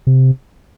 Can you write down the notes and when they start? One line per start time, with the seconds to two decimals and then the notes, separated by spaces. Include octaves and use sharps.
0.07 C3